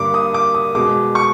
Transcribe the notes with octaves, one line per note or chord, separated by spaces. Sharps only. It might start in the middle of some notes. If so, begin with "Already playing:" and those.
Already playing: G2 D3 G3 A#3 D6
D#6
D6
D#6
B2 G#3 D6
C#6